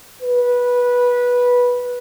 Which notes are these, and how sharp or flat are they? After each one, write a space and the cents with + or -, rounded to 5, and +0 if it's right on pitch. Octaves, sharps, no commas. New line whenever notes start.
B4 -15